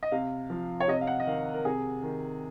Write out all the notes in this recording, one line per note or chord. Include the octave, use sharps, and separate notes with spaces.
D#5
C3 F5
F3
C#5
C3 D#5
F5
F#5
D#5
D#3 F5
A#4
C3 G#4
D#3